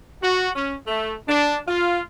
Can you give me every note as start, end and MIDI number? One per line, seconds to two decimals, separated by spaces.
0.23 0.50 66
0.56 0.75 61
0.87 1.15 57
1.28 1.59 62
1.68 2.00 65